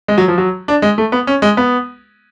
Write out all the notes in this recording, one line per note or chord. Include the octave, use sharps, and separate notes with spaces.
G#3
F#3
F3
F#3
D4
G#3
A3
B3
C#4
G#3
B3